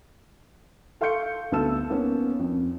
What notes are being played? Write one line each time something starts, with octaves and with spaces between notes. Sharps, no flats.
A4 F5 C6 C#6 G6 C#7
D2 B3 A4 A5 E6 E7
A#3 B3 C#4
F2